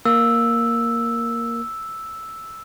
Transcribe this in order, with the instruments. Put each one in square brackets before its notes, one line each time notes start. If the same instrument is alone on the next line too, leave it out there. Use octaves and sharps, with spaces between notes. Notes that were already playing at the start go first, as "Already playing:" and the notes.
[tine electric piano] A#3 [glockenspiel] E6